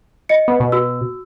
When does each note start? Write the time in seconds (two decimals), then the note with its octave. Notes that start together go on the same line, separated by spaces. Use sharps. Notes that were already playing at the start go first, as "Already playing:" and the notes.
0.29 D#5 C#7
0.48 B3
0.60 B2
0.72 F#4 E6